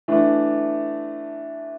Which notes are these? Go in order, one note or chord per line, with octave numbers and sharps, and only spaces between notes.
E3 A3 D4